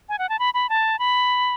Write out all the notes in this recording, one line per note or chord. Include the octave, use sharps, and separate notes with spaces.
G#5
F#5
A5
B5
B5
A5
B5